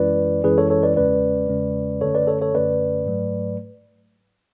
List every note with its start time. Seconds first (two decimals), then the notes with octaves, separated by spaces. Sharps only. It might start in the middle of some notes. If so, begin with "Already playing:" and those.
Already playing: F#2 E3 G#3 C#4 E4 B4 D5
0.44 F#2 E3 G#3 C#4 E4 G#4 B4
0.58 A4 C#5
0.70 A4 C#5
0.83 B4 D5
0.96 E2 C#3 G#3 C#4 B4 D5
1.49 E2 C#3 G#3 C#4
2.01 F#2 D3 A3 C#4 A4 C#5
2.15 B4 D5
2.27 A4 C#5
2.41 A4 C#5
2.54 F#2 D3 A3 C#4 B4 D5
3.06 G#2 F#3 A3